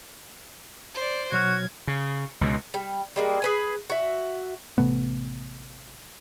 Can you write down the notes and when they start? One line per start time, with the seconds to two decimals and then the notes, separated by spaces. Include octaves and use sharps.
0.95 C5 D5
1.32 B2 F#3 F#4 F6 G#6
1.87 C#3
2.41 C#2 B2
2.74 G3
3.16 G3 G#3 A#3
3.42 G#4 B4 G#5
3.90 F#4 E5
4.78 A1 C3 A3 B3